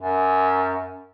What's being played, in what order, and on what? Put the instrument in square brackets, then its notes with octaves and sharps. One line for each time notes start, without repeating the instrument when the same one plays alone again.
[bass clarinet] F#2